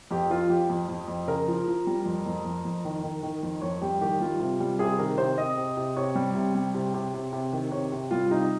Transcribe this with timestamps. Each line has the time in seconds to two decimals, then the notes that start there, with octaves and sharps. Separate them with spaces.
0.11 F2 G4
0.30 F3 F4
0.49 F2 G4
0.70 F2
0.88 F2
1.08 F2
1.28 C#3 A#4
1.48 F3
1.68 F3
1.87 G3
2.06 F2
2.26 F2
2.45 F2
2.65 F2
2.85 D#3
3.03 D#3
3.23 D#3
3.43 F2
3.62 F2 C#5
3.82 G3 G4
4.01 D#3 G4
4.20 G3 F4
4.40 C3
4.60 G3
4.79 C3 G#4
4.99 D#3 A#4
5.18 C3 C5
5.38 C3 D#5
5.57 C3
5.77 C3
5.97 C3 C#5
6.15 G3
6.35 C3
6.55 G3
6.75 C3
6.94 C3
7.14 C3
7.33 C3
7.53 D#3
7.72 C3 C#5
7.92 C3
8.11 G3 F4
8.30 C3 D#4